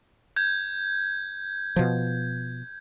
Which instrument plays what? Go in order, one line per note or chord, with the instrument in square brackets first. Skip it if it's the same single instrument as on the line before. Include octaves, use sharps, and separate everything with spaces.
[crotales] G6 G#6
[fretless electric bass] B2 F3